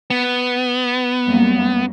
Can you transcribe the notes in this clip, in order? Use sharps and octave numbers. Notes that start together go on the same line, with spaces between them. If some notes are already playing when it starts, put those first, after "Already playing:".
B3
F#2 G3 A#3